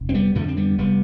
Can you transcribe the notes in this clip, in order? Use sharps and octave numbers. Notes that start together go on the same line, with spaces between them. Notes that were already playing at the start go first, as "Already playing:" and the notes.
Already playing: F1
C4
G3 B3
F2 D3 F3 A3
C4
G3 B3
F1 G3 B3